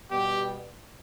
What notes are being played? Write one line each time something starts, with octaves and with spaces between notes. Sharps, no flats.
B2 G3 B3 G4